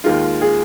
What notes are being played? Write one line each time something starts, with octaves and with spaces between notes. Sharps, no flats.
D#2 D#3 G#3 F4
G#4